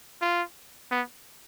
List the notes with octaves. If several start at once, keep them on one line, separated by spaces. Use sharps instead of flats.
F4
B3